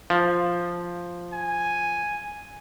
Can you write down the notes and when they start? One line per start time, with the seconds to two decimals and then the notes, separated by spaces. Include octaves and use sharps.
0.10 F3
1.33 G#5